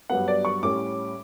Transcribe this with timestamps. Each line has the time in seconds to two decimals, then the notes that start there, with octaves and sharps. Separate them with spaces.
0.10 G2 F#3 B3 F#5
0.28 D5
0.45 C#6
0.63 A2 G3 C#4 D6